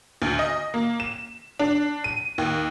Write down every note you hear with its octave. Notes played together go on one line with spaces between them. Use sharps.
D2
D#5
A#3
E7
D4
D#7
D#2